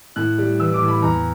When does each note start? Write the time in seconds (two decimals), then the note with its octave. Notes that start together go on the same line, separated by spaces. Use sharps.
0.16 A2 F#6
0.38 G3
0.59 E3 E6
0.74 D6
0.81 A2
0.88 B5
1.02 E2 A#5